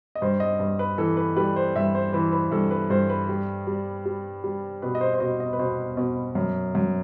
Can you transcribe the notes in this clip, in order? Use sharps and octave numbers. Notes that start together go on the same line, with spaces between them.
D#5
G2 C5
D#5
G2
B4
E3 A4
B4
G3 B4
C5
G2 E5
C5
E3 B4
B4
G2 A4
B4
G2 C5
B4
G3
G3
G3
G3
B2 B4
D#5
C5
C5
B2 D#5
D#5
B4
B2 C5
B2
F#2
F#2